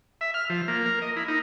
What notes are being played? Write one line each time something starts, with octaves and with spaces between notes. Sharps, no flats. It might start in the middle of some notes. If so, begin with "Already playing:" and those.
E5
F6
F3
A#3
A#4
D#5
E4
D#4